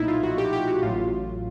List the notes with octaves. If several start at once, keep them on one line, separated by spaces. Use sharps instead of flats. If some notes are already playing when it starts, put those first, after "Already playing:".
Already playing: B1 A#2 F3 A3 D#4 E4
F4
F#4
G4
G4
F#4
A1 A2 F#3 F4